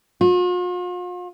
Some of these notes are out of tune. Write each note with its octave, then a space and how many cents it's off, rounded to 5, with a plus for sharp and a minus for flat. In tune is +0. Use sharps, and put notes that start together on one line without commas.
F4 +45